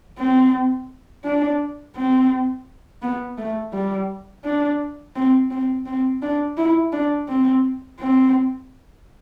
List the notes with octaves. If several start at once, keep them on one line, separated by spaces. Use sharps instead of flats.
C4
D4
C4
B3
A3
G3
D4
C4
C4
C4
D4
E4
D4
C4
C4